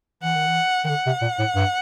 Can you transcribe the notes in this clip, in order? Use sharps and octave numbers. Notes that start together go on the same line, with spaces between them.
E3 F#5
D#3
E3
D#3
D3 F#5
C3
A#2
A2
G2